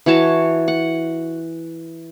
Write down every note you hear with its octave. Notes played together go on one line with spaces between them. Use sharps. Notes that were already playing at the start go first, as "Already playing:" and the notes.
E3 F#4 C#5 A5
F#5